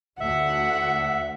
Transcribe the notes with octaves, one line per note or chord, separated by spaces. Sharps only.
D2 E5 F#5